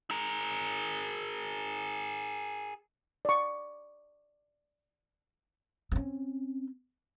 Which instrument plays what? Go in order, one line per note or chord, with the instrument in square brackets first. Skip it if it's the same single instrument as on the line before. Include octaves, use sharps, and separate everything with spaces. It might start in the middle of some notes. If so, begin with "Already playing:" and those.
[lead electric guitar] G#4 A#4
[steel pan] D5 C#6
[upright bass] C4 C#4